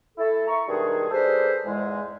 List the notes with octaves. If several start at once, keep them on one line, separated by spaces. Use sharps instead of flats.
A3 E4 A4
E5 A#5 C#6
B2 D#3 G3 G#3 D4 G#4
G3 D4 G#4 A4 B4 C5
E2 G#2 G#3